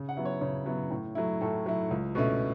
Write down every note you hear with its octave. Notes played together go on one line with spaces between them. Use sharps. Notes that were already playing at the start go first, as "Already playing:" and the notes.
Already playing: C#3
F#5
F#3 B3 E4
C#5
C#3 C#5
F#3 B3 E4
A2
F#3 A3 E4
A2 A4
F#3 A3 E4
C#2
B2 A3 C#4 E4